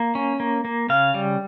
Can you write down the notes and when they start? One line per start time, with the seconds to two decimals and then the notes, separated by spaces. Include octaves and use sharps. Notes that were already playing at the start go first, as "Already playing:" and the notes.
Already playing: A#3
0.15 C#4
0.40 A#3
0.65 A#3
0.89 C#3 F5
1.14 G3